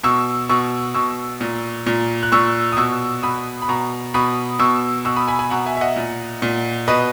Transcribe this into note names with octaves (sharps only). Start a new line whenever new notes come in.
B2 C#6 E6
B2 C#6 E6
B2 C#6 E6
A#2
A#2
F#6
A#2 C#6 E6
D#6
B2 C#6 E6
B2 B5 D#6
B5
B2 A#5 C#6
B2 B5 D#6
B2 C#6 E6
B2 C#6 E6
B5 D#6
G#5 B5
G#5 B5
B2 F#5 A#5
E5 G#5
E5
D#5 F#5
A#2
A#2
B2 B4 D#5